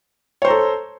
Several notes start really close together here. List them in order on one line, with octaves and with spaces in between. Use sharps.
C#5 C5 A#5 A4